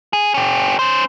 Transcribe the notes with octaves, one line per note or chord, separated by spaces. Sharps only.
G#4
C#4 G4
C#4 C5